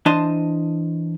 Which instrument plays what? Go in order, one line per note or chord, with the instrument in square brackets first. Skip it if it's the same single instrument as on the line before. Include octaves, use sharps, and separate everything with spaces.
[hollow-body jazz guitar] E3 D4 C5 D#5 A5 C6